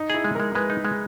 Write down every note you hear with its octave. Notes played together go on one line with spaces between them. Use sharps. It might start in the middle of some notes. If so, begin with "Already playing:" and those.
Already playing: D#4
E4 G#4
G#3
G#3 A#4
G#3 B4
D#4
G#3